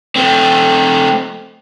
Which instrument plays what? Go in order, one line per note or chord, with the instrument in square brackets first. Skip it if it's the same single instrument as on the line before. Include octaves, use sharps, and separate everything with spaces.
[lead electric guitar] A3 C4